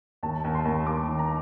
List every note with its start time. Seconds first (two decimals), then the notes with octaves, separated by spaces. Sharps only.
0.23 D#2 A5
0.44 D#2
0.55 C6
0.65 D#2
0.87 D#2 D6
1.08 D#3
1.19 A#5